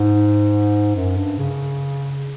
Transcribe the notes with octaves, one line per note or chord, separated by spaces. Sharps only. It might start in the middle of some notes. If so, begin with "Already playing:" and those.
Already playing: G#2
F#2
G2
C#3